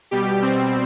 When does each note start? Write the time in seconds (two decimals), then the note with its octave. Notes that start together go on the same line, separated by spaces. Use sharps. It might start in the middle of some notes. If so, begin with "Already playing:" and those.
0.11 B2 G3 G4
0.42 B2 G3 C4